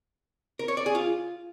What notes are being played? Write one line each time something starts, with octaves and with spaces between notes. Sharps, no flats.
A#4
C#5
D5
G#4
F4